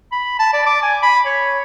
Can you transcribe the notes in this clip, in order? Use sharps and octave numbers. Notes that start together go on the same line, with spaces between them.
B5
A5
D5
D6
G#5
B5
C#5